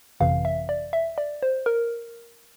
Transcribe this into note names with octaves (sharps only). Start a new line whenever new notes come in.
G1 F2 C3 E3 F5
E5
D5
E5
D5
C5
A#4